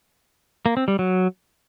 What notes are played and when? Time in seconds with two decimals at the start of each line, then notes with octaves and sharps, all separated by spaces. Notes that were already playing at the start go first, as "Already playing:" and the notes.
0.66 A#3
0.77 C4
0.88 G3
0.99 F#3